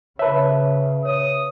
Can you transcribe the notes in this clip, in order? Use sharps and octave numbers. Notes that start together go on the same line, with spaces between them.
C#3 B4 C#5 E5 A5
C#5 D#6